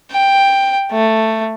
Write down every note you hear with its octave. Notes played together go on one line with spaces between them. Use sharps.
G5
A3